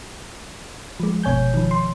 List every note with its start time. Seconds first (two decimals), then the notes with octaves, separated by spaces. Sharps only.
1.00 F3 G#3
1.23 G1 B2 C#5 G#5 G6
1.54 D#3 F3
1.71 C6